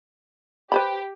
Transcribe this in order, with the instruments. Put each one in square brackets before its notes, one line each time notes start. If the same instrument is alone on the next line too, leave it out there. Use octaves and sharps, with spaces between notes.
[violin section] G4 [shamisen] B4 C5 B5